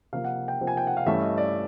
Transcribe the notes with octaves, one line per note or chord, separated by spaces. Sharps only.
C3 F3 A#3 F5
F#5
G5
C3 F3 A#3
G#5
G5
F#5
F5
G2 E3 A3 C#4 E5
D#5
D5